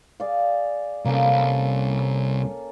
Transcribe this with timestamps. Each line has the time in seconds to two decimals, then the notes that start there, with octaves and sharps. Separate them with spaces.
0.20 G#4 D5 F5
1.05 C2 A#3 C#4 A4